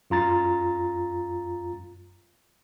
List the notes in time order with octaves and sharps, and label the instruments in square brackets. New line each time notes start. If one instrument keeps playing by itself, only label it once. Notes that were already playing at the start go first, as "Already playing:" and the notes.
[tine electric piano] F#2 F4 A#5 A6